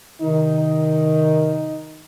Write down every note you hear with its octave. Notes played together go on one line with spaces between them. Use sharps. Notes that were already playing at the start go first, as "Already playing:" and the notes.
C3 D#3 D#4